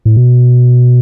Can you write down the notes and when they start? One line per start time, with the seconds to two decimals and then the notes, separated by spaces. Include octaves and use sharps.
0.05 A2
0.16 B2